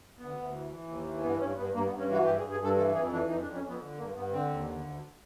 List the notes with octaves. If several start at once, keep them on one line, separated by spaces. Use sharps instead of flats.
D2 B3
D2
E3
E3
D#2
E3
G2 B3
G2 C#4
G2 B3
G2 A#3
B3
G2
C#4
E3 F#4
G2 G4
G#4
G2
G#4
G2 A4
E3 A4
F2 G#4
E3 D4
F2 D#4
D4
F2
C#4
F2 B3
D3
G2 A#3
G2 B3
D3 C4
D#2
D3
D2